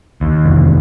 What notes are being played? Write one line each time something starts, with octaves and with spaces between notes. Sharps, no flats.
D#2
F1